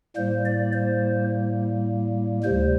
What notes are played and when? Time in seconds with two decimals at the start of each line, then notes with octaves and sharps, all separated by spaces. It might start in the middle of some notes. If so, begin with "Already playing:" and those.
0.16 A2 G3 A#3 C5
0.45 D5
0.73 C5
2.43 D2 C3 G3 C5